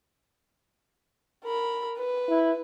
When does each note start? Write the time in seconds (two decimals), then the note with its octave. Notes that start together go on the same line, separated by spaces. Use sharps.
1.45 A#4 B5
1.98 B4
2.29 E4